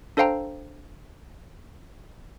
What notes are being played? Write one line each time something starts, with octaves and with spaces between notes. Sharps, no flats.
D4 A4 C5 F5 G5 A#5